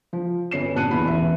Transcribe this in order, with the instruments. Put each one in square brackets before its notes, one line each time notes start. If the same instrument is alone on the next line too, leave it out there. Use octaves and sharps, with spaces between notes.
[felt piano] F3
G1 C#4 C7 E7
G2 A#2 A5 F#6 C#7 D#7
E2 B3 E4 B5
E1 A1 E5